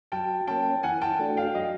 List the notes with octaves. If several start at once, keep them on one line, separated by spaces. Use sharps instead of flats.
F#3 G5 A5
A#3 C#4 G5 A5
E3 F#5 G#5
G5 A5
A3 D4 F#4
F5 G5
F#3 D#5 F5